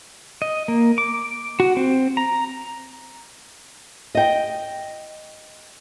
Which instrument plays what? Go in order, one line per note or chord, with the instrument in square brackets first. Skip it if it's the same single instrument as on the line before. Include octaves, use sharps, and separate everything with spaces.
[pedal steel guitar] D#5
A#3
D6
F#4
C4
A#5
[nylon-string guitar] D#5 G5